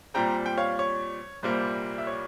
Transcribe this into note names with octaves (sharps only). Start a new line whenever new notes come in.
A#2 G3 C4 G5 A#5
G5
C#5 F5
C#5
C2 A#2 G3 A#3 C5
E5
C#5